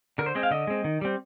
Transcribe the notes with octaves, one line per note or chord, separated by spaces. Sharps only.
D3 A#4
C5
G#3 C4 D#5
F5
D3 D#5
G#3 C4
D#3
G3 C4